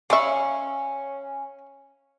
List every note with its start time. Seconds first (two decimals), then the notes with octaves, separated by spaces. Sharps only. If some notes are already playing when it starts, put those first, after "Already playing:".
0.10 C#4 D5 E5 F5 B5 C#6